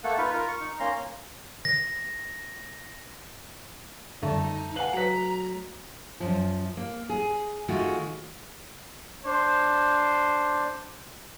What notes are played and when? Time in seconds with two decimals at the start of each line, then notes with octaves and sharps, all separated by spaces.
0.04 A3 A#3 A4 F#5
0.18 D#4 F4 B4
0.34 F4 A#4
0.48 C#6
0.60 D#4
0.80 A#3 C#4 A#5 C6
1.65 A#6
4.23 F#2 D3 G3 A3 D#4
4.76 B4 F5 F#5 G#5 F#7
4.93 F#3 B4 F#5 A#5 B6
6.20 F#2 F3
6.77 A#3
7.10 G#4
7.68 D#3 G#3 A3 F4 F#4
9.25 D4 C5